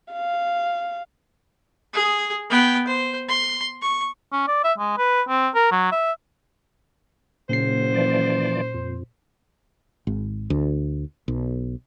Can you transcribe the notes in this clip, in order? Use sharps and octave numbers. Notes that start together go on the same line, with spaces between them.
F5
G#4
B3 G5
C5
C6
C#6
C#4
D5
E5
G#3
B4
C4
A#4
F#3
E5
F#1 A#2 C#3 C5 C7
E3 F3 D5
F2
G#1
D2
B1